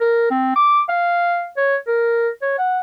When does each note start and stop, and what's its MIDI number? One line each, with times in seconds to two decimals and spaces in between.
0.01 0.28 70
0.31 0.55 60
0.56 0.81 86
0.89 1.48 77
1.57 1.76 73
1.87 2.29 70
2.42 2.55 73
2.58 2.80 78